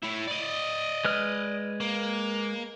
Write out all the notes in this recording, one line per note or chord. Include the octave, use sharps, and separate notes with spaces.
A2 E4
D5 D#5
G#3 B4 F6
A#3